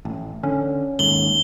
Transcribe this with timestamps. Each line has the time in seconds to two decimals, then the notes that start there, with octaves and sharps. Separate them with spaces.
0.05 A1
0.43 D3 C#4
0.99 D#2 G#2 F#7 G7